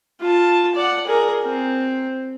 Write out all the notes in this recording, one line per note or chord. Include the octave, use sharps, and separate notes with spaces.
F4 A5
D5 F#5
G#4 A#4
C4